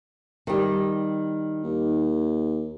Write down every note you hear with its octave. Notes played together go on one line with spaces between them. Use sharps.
D#3 G3
D#2